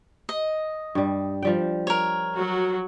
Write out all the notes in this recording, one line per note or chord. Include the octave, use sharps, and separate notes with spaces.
D#5
G2 G3
F3 G3 G5
A#4 C#5
F#3 F#4